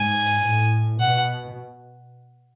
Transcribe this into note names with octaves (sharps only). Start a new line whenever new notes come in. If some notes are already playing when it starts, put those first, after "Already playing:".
Already playing: G#2 G#5
A2
B2 F#5